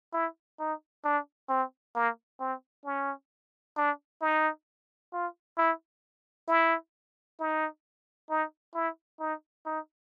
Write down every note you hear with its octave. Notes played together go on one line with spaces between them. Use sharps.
E4
D#4
D4
C4
A#3
C4
C#4
D4
D#4
F4
E4
E4
D#4
D#4
E4
D#4
D#4